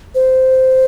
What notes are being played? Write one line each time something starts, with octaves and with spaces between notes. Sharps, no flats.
C5